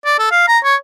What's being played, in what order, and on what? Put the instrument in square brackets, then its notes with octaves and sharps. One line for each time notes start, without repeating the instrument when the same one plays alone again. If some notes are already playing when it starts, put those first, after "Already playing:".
[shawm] D5
A4
F5
A#5
C#5